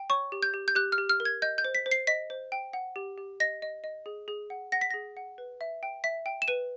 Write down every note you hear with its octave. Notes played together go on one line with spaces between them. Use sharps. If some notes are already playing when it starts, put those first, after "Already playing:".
Already playing: G5
C#5 C#6
G4
G6
G4
G6
G4 F#6
F6
G4
F6
A#4
G#6
D#5 G6
G6
C5
B6
C5
C7
D#5 B6
C5
G5
F#5
G4
G4
D#5 A#6
D#5
D#5
G#4
G#4
F#5
F#5 A#6
B6
G#4 A#6
F#5
B4
E5
G5
E5 B6
G5
E7
B4 D#7